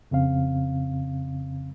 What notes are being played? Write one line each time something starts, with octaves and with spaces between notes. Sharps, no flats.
F2 C#3 C4 F5